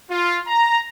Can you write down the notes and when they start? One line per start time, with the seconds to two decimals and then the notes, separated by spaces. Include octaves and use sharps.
0.10 F4
0.47 A#5